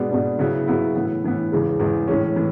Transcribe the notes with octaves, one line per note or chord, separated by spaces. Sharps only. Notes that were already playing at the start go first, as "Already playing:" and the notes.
Already playing: B2 G#3 B3 D4
B2 G#3 B3 D4
C#3 F#3 B3 E4
C#3 F#3 B3 E4
A2 E3 B3
A2 E3 B3
E2 C#3 G#3
E2 C#3 G#3
A2 E3 G#3 C#4
A2 E3